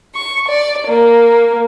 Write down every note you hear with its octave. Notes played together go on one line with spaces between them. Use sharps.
C#6
D5
A#3